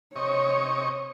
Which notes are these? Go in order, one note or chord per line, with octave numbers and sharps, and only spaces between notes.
C3 C#5 D#5 C#6